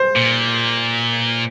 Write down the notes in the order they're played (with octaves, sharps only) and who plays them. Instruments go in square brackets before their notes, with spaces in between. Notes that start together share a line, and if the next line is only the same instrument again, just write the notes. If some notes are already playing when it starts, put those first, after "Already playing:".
Already playing: [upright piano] C5
[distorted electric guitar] A#2